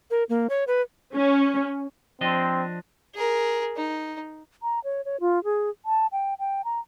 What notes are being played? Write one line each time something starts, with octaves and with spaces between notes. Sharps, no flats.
A#4
A#3
C#5
B4
C#4
F3 C4 D4 D#5
G#4 A#4
D#4
A#5
C#5
C#5
F4
G#4
A5
G5
G5
A#5